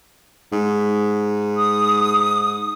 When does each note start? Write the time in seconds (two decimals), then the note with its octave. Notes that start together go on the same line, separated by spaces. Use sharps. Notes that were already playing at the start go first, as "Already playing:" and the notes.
0.52 G#2
1.56 D#6